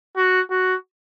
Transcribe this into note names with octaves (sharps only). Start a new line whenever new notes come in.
F#4
F#4